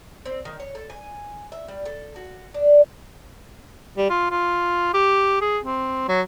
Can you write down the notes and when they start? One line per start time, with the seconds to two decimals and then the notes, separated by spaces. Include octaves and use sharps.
0.26 C4
0.45 D#3
0.60 C#5
0.75 A4
0.90 G#5
1.52 E5
1.68 G3
1.85 A4
2.16 F#4
2.54 D4
3.97 G3
4.10 F4
4.31 F4
4.94 G4
5.41 G#4
5.64 C4
6.08 F#3